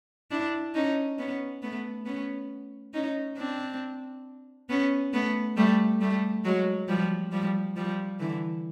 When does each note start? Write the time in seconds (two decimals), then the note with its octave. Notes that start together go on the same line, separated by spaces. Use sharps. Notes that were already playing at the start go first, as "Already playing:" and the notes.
0.31 D4 E4
0.74 C#4 D#4
1.18 B3 C#4
1.63 A3 B3
2.06 B3 C#4
2.94 C#4 D#4
3.37 C4 D4
4.69 B3 C#4
5.13 A3 B3
5.57 G3 A3
6.01 G3 A3
6.44 F#3 G#3
6.88 F3 G3
7.32 F3 G3
7.76 F3 G3
8.20 D3 E3